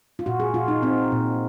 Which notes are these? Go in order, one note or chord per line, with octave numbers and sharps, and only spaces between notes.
F4
A#2 F#4
G#4
A#2 F4
D#4
C4 D#4
A#2